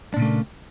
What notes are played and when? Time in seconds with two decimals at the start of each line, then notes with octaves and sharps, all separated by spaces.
0.14 D4
0.17 A#2
0.19 C#3
0.22 A3
0.25 A#3